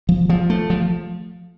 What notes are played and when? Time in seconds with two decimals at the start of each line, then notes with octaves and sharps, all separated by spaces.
0.09 F3
0.30 F3
0.50 A3
0.70 F3